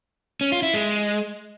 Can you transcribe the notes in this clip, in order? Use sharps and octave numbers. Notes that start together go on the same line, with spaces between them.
C#4
F4
E4
G#3